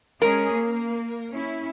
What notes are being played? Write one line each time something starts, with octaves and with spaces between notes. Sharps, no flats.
G#3 C#4 G#4 A#4
A#3
C#4 E4